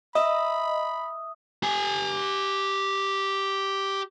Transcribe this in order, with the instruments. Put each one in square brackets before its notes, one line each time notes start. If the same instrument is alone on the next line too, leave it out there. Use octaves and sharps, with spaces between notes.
[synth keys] D#5 [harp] E5 [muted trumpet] B5 [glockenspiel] D#6
[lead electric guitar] G4 G#5